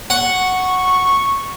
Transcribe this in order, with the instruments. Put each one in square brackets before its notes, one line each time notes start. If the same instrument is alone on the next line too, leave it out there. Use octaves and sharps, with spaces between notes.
[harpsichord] F#5 [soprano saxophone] C#6